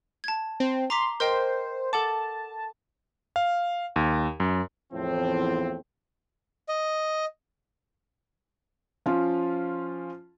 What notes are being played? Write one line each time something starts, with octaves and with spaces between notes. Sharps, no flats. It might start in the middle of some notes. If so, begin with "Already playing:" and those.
A5 G#6
C4
A#5 C6 D6 B6
A#4 C5 D#5 G5
A4 F#5 A5 D6
F5
D#2
F#2
E2 A2 F3 C4
D#5
F3 C#4 F4